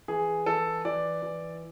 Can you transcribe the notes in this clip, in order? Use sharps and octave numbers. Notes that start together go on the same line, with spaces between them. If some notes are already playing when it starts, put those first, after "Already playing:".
E3 G#4
E3 A4
E3 D5
E3